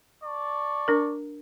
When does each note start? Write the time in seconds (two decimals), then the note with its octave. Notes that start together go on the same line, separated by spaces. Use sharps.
0.24 D5 A5 C#6
0.88 D4 A#4